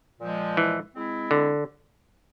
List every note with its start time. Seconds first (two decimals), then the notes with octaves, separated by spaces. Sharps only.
0.20 A#2 F3 G#3
0.57 E3
0.94 G#3 C4 E4
1.31 D3